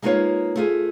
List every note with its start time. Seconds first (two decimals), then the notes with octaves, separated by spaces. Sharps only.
0.02 G#3 A#3 D#4 F4 B4 C#5
0.56 A3 F4 G#4